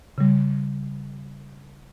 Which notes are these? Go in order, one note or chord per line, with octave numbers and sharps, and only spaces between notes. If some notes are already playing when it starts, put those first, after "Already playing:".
C#3 G3